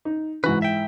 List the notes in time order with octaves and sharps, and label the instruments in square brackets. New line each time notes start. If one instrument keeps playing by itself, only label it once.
[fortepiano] D#4
[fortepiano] G#2 E3 [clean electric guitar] F#4 B4
[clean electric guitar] E5 G5